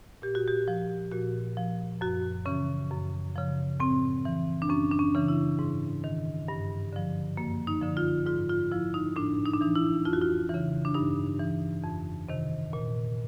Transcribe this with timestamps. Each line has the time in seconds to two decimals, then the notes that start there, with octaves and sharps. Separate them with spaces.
0.22 A#2 G4
0.35 F#4
0.48 G4
0.68 F3
1.11 A#2 F#4
1.57 F3
2.01 F#2 F#4
2.46 C#3 E3 C#4
2.91 F#2
3.36 C#3 F3
3.80 A2 C4
4.25 E3
4.62 D4
4.70 F#2 C#4
4.91 D4
4.99 C#4
5.15 C#3 E3
5.28 E4
5.59 G#2
6.04 D#3
6.48 G2
6.93 D3 F3
7.37 F#2 A#3
7.67 D#4
7.81 D3 F3
7.97 F4
8.26 G#2 F4
8.49 F4
8.72 F3 E4
8.94 D#4
9.16 A2 D4
9.46 D#4
9.53 D4
9.61 E3 D#4
9.75 E4
10.05 F2 F4
10.13 F#4
10.21 F4
10.50 C#3 E3
10.85 D4
10.95 G2 D#4
11.39 E3
11.84 F2
12.29 C3 D#3
12.73 A#2